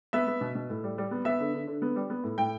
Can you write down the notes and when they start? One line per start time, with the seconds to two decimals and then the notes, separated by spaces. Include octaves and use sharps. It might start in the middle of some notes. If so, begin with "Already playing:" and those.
0.13 B3 E5
0.27 B3
0.41 B2
0.55 B2
0.70 A2
0.84 G3
0.98 G3
1.11 B3
1.25 B3 E5
1.40 D3
1.54 D3
1.67 D3
1.82 B3
1.96 G3
2.10 B3
2.24 A2
2.38 A2 G5